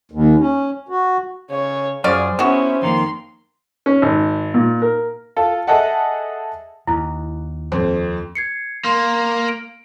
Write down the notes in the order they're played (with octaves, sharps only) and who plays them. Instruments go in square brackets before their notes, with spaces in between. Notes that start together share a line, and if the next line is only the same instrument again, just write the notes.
[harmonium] D#2
C#4
F#4
[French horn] C#3 [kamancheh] C#5
[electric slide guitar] F#2 [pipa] C#4 F4 D5 [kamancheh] G#4 [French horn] C5
[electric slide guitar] B3 [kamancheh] C#4 E4 [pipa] F#4 G#4
[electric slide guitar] F2 D#3 A#3 [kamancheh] C6
[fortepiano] C#4
G#1
A#2
A#4
F4 A4
G#4 A4 D#5 E5 F#5 A5
[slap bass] D#2 [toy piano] E4
[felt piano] F2 C4
[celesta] G#6 C7 C#7
[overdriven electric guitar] A#3 [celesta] C6
[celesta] D7